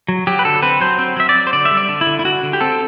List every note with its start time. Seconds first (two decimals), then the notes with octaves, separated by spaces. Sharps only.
0.08 F#3
0.27 F#3 G4
0.39 B4
0.45 D3 A4
0.62 C4 B4
0.81 F#3 C5
0.98 C4
1.17 F#3 E5
1.29 D5
1.35 F#3
1.47 C5
1.53 D3 D5
1.65 E5
1.71 G3
1.77 D5
1.89 D3
2.01 E4
2.07 D3
2.19 E4
2.25 D3 F#4
2.43 D3
2.53 G4
2.61 C4 A4